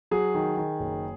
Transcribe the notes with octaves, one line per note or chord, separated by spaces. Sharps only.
F#3 G#4
D#3
D#3
F#1